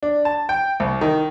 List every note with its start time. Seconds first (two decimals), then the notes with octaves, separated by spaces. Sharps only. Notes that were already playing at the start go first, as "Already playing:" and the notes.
0.03 D4
0.25 A5
0.49 G5
0.80 C2
1.01 D#3